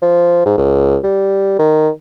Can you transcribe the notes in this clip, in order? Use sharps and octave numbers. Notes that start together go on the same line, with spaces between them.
F3
G#2
C#2
G3
D#3